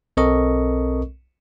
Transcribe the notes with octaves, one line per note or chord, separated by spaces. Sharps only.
B1 C4 A4 A#4 D#5 C#6